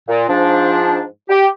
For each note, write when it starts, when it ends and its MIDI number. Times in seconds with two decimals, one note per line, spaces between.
0.08 0.24 46
0.28 1.02 44
0.28 1.02 53
0.28 1.02 62
1.29 1.46 67